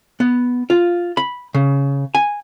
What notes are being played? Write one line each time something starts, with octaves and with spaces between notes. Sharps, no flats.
B3
F4
B5
C#3
G#5